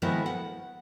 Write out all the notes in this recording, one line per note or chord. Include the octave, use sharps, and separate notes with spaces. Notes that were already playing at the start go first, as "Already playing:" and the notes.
D#3 F3 G#3 A3 B3 E4
F#5